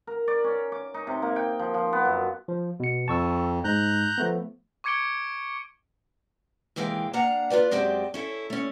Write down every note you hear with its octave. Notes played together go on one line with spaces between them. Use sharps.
A#4
D5
C#4
D6
D#4
C3
A#3
G5
F3
F3
B3
F#2
F3
B2 C#7
F2 A5 C#6 E6
G#2 G#3 A#5 F#6 G6
F3 A3 B3
C#6 D6 G#6 C#7 D7 G7
D#2 C3 E3 G#3 F5 G5
A#3 D4 F5 F#5 A#5
F4 G4 B4 D5
F#2 G#3 C4 G4 D5 A5
C#4 E4 A4
A3 C#4